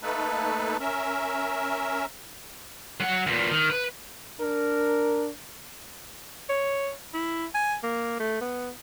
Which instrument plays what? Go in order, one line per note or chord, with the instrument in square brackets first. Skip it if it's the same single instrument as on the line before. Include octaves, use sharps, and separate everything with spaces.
[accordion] A3 A#3 D#4 A4 B4
C#4 A#4 E5
[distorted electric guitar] F#3 F#5
E2 A#2
D#3
B4
[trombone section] D4 A#4
[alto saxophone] C#5
E4
G#5
A#3
A3
B3